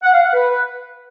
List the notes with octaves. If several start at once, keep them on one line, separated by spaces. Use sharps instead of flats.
F#5
F5
F#5
B4